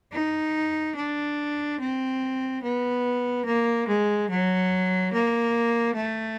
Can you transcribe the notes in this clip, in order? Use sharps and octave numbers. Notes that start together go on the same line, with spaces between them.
D#4
D4
C4
B3
A#3
G#3
F#3
A#3
A3